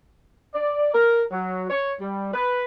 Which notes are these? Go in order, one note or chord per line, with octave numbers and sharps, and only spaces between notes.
D5
A#4
F#3
C#5
G3
B4